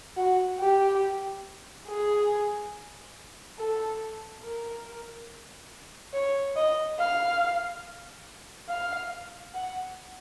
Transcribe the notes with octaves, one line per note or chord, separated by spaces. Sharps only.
F#4
G4
G#4
A4
A#4
C#5
D#5
F5
F5
F#5